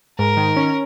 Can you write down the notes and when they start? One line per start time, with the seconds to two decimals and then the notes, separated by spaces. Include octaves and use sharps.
0.18 G#2 A#4
0.37 D#3
0.56 C#4